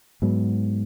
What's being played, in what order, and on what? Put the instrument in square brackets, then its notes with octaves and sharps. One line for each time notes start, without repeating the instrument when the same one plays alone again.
[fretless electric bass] G#2 F#3 B3